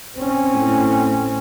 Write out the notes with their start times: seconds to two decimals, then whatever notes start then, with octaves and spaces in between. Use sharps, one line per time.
0.16 C4 C#4
0.54 A2